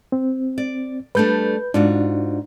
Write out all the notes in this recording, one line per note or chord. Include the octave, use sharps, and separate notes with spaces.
C4
D5
G3 A3 D4 B4 G6
G#2 D4 F4 F#4